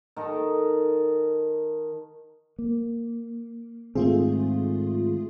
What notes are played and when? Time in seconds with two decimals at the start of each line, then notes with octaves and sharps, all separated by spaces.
0.16 D#3 A4 D#5
2.59 A#3
3.95 G#2 D#3 A3 C4 F4 G#4